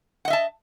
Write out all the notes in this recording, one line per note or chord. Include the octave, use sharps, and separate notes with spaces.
D#5 E5 F#5 A5